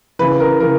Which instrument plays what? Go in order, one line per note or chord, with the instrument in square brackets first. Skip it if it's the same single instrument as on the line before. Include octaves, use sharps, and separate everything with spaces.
[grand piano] C#3 E3 B4
A#4
C#3 E3 A#4